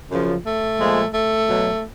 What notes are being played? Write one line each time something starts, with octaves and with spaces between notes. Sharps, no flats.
F#2 C#3 F3
A3
A#2 F3 G#3
A3
B2 F#3